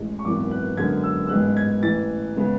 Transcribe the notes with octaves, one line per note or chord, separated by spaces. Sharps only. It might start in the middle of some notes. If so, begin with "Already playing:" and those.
Already playing: A1 A2 G#3
C#6
G#1 F#2 E3 B3 D6
F#6
F#2 D3 G#3 B3 G#6
E6
E6
A1 G#2 G#3 B3 F#6
G#6
A1 A2 E3 A6
C#3 G#3 B3